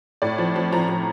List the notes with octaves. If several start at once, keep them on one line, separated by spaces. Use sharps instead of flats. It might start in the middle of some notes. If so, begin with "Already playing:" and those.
A2 D5
F3
F3
F3 A#5
F3